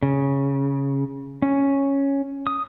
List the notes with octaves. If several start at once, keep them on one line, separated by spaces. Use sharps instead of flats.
C#3
C#4
D#6